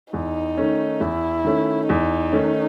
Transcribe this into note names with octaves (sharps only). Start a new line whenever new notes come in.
E2 D#4
D#3 A3 C#4
E2 E4
D#3 A3 C#4
E2 D#4
D#3 A3 C#4